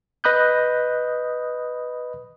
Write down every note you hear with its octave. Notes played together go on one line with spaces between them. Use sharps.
B4 D#5 B5 D#6 F#6 G6